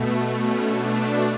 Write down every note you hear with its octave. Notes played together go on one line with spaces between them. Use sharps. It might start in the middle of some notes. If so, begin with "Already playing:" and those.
Already playing: B2 A3
C#4
D4